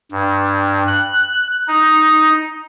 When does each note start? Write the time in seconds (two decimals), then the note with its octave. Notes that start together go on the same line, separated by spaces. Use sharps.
0.11 G2
0.87 F#6
1.68 D#4